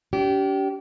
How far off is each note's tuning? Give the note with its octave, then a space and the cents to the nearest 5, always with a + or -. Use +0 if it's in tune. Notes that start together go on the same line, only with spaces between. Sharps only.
D4 -45 G4 -25